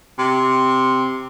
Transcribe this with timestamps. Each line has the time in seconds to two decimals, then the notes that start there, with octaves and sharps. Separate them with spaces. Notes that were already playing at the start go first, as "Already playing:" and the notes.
0.19 C3